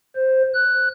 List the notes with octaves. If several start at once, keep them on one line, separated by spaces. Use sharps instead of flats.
C5
F#6